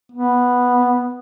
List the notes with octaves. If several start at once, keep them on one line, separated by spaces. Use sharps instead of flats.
B3